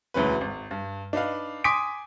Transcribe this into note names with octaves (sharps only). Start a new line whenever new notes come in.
E1 D2 E3 C#4 B4
G#1
G2
D4 D#4 B4 F5
G#5 C6 D6 D#6 B6 D7